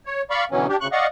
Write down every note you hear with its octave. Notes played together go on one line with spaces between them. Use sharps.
C#5
D5 F5 B5 C#6
D2 B2 E3 F#3 C#4
D4 G4
D2 C#3 C#6 F#6
D5 D#5 F5 F#5 C#6